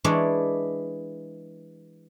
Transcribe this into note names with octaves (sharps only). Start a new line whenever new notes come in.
E3 G#3 D4 E4 C#5 D5